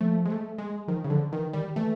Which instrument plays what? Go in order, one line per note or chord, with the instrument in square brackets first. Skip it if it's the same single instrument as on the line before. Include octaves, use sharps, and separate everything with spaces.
[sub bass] F3 [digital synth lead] A3
[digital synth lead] G#3
A3
G#3
[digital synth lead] D#3 [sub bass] F3
[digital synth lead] C#3
[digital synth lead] D3 [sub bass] F3
[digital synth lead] D#3 [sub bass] E3
[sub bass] D#3 [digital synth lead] G3
[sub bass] E3 [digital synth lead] A3